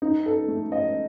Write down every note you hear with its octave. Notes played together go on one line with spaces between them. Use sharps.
D#4
A4
A3
D#5